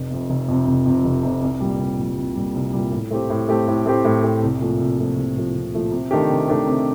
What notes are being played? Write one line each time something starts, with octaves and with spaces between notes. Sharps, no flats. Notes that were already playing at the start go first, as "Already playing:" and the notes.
Already playing: F1
F2 C3
F1
F2 C3
F1
F2 C3
F1
F2 C3
C2
A#2 G3
C2
A#2 G3
C2
A#2 G3
C2
A#2 G3
A2
A3 C4 G4
A2
A3 C4 G4
A2
A3 C4 G4
A2
A3 C4 G4
C2
A#2 F3 A3
C2
A#2 F3 A3
C2
A#2 F3 A3
C2
A#2 F3 A3
C3
D#3 A3 D4 G4
C3
D#3 A3 D4 G4
C3